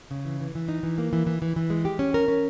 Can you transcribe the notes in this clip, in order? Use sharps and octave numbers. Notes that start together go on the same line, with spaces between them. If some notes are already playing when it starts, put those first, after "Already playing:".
C#3
E3
E3
E3
D#4
E3
A#3
E3
E3
E3
E3
G#3
G4
C#4
A#4
C#4